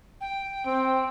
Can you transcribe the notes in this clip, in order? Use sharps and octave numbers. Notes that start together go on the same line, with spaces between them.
G5
C4